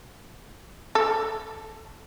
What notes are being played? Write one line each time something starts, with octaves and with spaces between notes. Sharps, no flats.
A4